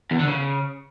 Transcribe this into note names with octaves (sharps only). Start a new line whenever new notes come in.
E2
D3
C#3